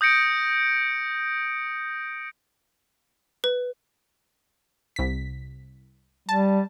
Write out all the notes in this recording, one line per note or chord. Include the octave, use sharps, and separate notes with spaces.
D#6 G6 A#6 C#7 D7
B4
C2 B6
G3 A5